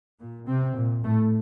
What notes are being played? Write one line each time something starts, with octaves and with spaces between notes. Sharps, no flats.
A#2
C3 C4
A#2
A2 A3